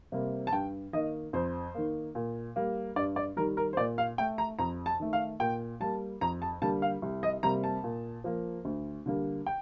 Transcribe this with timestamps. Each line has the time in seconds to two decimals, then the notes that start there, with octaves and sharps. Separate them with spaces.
0.12 C3 G3 A#3
0.47 A5
0.52 G2 G5
0.93 D#3 A#3 D#5
1.33 F2 C5
1.75 D#3 A#3
2.15 A#2
2.56 G3 A#3
2.96 G2 D5
3.16 D5
3.37 D#3 G3 A#4
3.57 A#4
3.73 C5
3.77 A#2 D5
3.98 F5
4.18 A3 G5
4.38 A#5
4.59 F2 A#5
4.86 A5
5.00 D#3 A3
5.13 F5
5.40 A#2 G5
5.80 G3 A#3 A5
6.21 F2 A#5
6.42 A5
6.62 D3 G3 A#3 A5
6.82 F5
7.02 C2
7.23 D#5
7.43 C3 G3 A#3 A#5
7.64 A5
7.84 A#2
8.24 F3 A#3
8.65 D2
9.06 D3 G3 A#3
9.46 G5